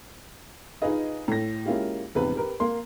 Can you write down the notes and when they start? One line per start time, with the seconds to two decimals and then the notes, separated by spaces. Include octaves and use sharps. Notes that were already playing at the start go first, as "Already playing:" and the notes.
0.82 D#4 F4 G#4 B4 D#5
1.28 A2 A#6
1.66 G#3 A#3 C#4 E4 F4 G4
2.15 A#1 E2 G#2 C3 B4
2.36 G4 A#4 B4
2.60 A#3 C6